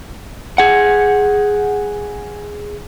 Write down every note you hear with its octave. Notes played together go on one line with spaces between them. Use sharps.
G#4 F#5